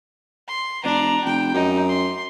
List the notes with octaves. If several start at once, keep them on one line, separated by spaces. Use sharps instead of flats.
C6
F1 D4 A#5
F1 G5
F#2 D#4
C6